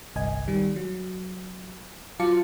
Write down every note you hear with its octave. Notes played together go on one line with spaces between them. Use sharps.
G1 C2 D#5 G#5
D#3 G3
F#3
F#3 F4 F5 A5 D6 C#7